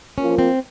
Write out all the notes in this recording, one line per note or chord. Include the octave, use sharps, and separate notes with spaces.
F3 A#3 C#4 F4
C4